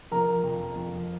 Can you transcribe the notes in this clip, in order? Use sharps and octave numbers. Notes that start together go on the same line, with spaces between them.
F3 A#4 A#5
F2
F2